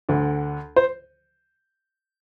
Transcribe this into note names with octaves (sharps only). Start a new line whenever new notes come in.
D2 D3
C5